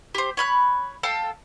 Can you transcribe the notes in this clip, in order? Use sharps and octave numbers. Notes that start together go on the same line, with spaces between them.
G4 C5
C#5 B5 F#6
A4 F5 G5 A5